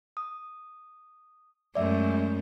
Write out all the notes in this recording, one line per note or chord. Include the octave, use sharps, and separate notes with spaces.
D#6
F#2 G#3 A3 D5 E5